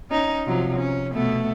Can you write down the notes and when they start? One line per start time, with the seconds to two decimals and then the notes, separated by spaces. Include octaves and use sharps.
0.10 C#4 D#4
0.46 C3 F3 F#3
0.76 C#4
1.13 B2 A3 B3